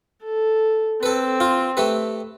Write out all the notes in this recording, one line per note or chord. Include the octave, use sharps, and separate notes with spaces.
A4
C4 A4 B4
F4
A3 G4 B4